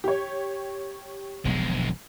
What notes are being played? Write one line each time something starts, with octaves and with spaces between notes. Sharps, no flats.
G4 C#5
E1 B1 F2 D3 G#3